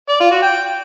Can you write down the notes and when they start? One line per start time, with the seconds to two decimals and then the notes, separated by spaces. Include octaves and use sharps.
0.09 D5
0.20 F4
0.31 F#4
0.42 G5